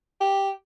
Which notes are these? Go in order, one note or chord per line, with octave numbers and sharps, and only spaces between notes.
G4